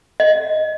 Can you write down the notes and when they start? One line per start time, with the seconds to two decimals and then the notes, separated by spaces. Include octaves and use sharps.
0.20 D#5